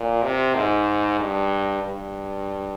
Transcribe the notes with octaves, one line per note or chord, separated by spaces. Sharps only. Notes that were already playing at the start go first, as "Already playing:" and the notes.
Already playing: A#2
C3
G#2
G2
G2